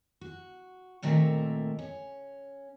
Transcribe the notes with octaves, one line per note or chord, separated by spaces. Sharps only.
F#4
A#2 D#3 A3 C4 A#4 E5
C#4